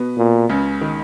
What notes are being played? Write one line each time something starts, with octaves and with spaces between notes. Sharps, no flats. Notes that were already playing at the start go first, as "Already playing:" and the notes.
Already playing: B2 B3
A#2
C#2 C#3
D#3